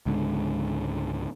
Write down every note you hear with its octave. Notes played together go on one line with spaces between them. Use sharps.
C#2 G#2 D3